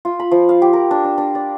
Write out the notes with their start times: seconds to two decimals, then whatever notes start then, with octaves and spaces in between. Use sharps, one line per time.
0.05 F4
0.20 B5
0.31 F3
0.49 F5
0.62 G4
0.73 A#4
0.91 D4
1.04 D4
1.18 D4
1.35 D5